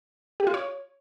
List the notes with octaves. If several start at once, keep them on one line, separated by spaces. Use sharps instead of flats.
G4
F4
C#5